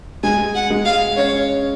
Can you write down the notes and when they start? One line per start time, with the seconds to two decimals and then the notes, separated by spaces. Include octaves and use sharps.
0.23 G#3 G#5
0.55 F#5
0.70 G#3
0.85 F5
1.17 C#4 C#5